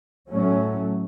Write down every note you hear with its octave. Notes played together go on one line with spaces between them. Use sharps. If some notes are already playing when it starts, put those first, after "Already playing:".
A2 F#3 A3 C#4